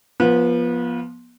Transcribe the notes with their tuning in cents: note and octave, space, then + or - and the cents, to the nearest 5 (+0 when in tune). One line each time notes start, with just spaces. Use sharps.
F3 +0 B3 -30